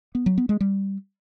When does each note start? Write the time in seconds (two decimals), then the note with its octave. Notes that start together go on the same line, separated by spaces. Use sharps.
0.15 B3
0.26 F#3
0.38 B3
0.49 G#3
0.61 G3